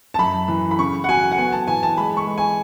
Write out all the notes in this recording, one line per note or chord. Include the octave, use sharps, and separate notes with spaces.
A5
F#2 B5
E3
B5
C#3 C#6
F#5
F#3 G#5
F#5
B3 G#5
A5
E3 G#5
A5
G#3 B5
C#6
G#3
G#5